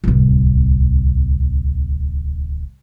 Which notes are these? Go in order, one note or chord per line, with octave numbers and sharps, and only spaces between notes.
D1 C2